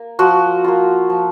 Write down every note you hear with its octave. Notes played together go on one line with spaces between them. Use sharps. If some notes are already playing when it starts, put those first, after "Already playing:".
Already playing: A#3
F3 F#4
A#3 F4
F3